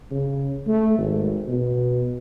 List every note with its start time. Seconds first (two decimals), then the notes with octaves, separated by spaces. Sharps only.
0.11 C#3
0.67 A3
0.98 G#1
1.48 B2